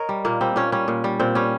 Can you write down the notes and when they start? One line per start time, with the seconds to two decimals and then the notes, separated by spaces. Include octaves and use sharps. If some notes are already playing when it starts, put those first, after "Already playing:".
Already playing: A#4 C#5 D#5
0.09 G3
0.25 A#2 A#3
0.41 G3 C4
0.56 A#2 C#4
0.72 G3 C#4
0.88 A#2
1.04 G3
1.19 A#2 C4
1.35 G3 C#4